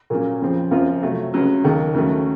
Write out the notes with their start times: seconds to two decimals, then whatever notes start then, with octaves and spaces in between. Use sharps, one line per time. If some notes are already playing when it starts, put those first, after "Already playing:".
0.10 A#2 F#3 A#3 C#4
0.42 F2 C#3 F3 C4
0.71 F#2 C#3 F3 C4 F4
1.03 C3 F#3 A3
1.34 C#2 C#3 F#3
1.64 D#2 D#3 A#3 D#4
1.94 D#2 C#3 F#3 A3